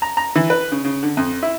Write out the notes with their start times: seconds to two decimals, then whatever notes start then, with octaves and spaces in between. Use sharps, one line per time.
0.02 A#5
0.17 A#5
0.35 E3
0.50 B4
0.72 C#3
0.85 C#3
1.03 D3
1.17 F2
1.43 E4